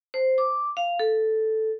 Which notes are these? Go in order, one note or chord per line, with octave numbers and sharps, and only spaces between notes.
C5
D6
F5
A4